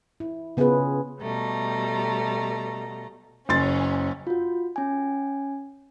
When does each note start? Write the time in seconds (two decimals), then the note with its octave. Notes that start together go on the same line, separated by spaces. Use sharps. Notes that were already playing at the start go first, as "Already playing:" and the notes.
0.20 E4
0.57 C#3 B3 C#4 F4 G#4 B4
1.21 B2 G3 A3 A#5
3.49 F#1 C#4 C6 A6
4.27 F4 F#4
4.76 C#4 G#5